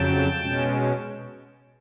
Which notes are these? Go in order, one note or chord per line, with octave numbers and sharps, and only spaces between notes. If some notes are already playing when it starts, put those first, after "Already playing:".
Already playing: F2 C#3 F#3 G5 A5
B2 G#3 C#4